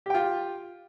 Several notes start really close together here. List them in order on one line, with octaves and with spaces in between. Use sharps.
G4 G5 F4